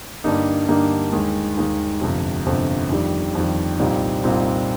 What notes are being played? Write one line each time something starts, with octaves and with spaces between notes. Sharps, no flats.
G2 D3 G3 A#3 D#4
G2 D3 G3 A#3 D#4
D#2 D#3 G#3
D#2 D#3 G#3
G1 F2 C3
G1 F2 C3
F2 D#3 G3
F2 D#3 G3
C2 A#2 G3 C4 D#4
C2 A#2 G3 C4 D#4